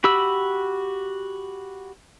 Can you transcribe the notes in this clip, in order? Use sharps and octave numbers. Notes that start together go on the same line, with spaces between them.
F#4 G4 B5 E6